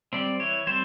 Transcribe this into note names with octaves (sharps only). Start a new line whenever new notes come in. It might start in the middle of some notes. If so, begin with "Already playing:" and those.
G3 C4 D5
E3 C#5
G3 C4 C5